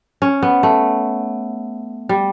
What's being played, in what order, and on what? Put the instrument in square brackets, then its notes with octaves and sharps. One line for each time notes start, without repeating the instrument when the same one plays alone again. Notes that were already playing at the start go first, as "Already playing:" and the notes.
[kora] C#4
B3
A3
G3